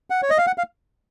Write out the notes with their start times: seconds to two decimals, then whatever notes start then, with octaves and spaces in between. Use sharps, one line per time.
0.10 F#5
0.22 C#5
0.30 D#5
0.38 F5
0.47 F#5
0.58 F5